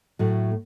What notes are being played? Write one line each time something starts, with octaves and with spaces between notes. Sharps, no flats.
A2 F#3 A3